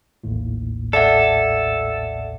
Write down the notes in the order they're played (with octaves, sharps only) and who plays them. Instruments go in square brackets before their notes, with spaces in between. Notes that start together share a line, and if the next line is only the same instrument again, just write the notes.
[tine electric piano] A1 D#2 A2
[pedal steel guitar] A4 [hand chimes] D5 E5 F#5